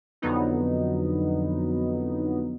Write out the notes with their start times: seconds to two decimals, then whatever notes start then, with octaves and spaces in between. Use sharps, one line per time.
0.22 F2 D3 F#3 B3 D#4